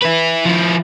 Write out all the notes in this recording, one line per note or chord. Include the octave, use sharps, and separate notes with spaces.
E4 B4
F3 E4